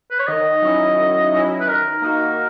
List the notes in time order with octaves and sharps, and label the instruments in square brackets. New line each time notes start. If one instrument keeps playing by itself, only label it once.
[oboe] B4
C#5
[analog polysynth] D#3 [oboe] D#5
[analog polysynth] F#3 C#4 E4
D#3
F#3 C#4 E4
[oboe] B4
[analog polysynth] D#3 [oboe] A#4
[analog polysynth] A#3 D#4 F#4